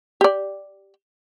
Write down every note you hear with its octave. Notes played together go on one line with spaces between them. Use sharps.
G4 D5